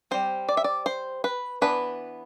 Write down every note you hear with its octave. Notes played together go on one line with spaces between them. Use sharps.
G3 C4 C5
D5
E5
D5
C5
B4
E3 B3 D4 B4